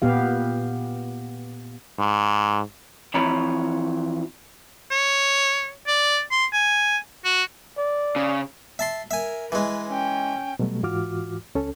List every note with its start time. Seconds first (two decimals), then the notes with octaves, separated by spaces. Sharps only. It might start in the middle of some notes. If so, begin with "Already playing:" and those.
0.02 A#2 B3 G4 F5
1.99 G#2
3.14 E3 F3 C4 C#5 A#5 B5
4.91 C#5
5.87 D5
6.31 C6
6.53 G#5
7.25 F#4
7.77 D5
8.16 C#3
8.79 E5 A5 C6
9.11 A#4 E5 G#5
9.52 E3 G#3 B4
9.88 C#4 G5
10.59 B2 F#3 G3 A3
10.83 G#2 E3 F4 F#4 D6 F6
11.55 C#2 C#4 A4